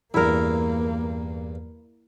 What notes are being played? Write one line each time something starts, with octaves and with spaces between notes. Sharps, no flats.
E2 G2 A#3 E4 A#4